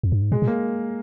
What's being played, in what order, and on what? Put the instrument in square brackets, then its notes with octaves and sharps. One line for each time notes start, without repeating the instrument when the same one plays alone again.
[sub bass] F2
G2
G#2
[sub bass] A#2 [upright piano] G#3
[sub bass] A#2
[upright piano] A#3